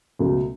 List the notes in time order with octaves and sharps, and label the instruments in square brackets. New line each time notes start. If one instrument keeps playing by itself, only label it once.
[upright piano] C#2 B2 F#3 A3